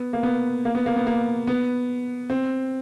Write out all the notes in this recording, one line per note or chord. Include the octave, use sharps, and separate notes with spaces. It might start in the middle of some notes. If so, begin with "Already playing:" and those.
Already playing: B3
A#3
B3
A#3
B3
A#3
B3
A#3
B3
C4